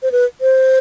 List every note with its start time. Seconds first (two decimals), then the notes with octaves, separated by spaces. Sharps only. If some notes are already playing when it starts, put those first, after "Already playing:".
0.03 C5
0.12 B4
0.41 C5